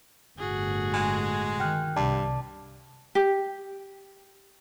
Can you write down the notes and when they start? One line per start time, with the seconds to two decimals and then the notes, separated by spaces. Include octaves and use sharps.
0.39 G1 A2 F#4 G#4
0.94 G#3
1.60 D#3 G5 F6 F#6
1.96 C2 G2 D5 A5 D6
3.15 G4